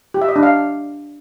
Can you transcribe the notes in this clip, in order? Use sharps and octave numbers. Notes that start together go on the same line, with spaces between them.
G4
E5
D#5
D4
F5